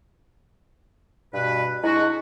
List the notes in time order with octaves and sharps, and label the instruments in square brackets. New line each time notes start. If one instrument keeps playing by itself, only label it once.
[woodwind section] G2 B2 B4
[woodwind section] G#3 D4 F#4 [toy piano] E4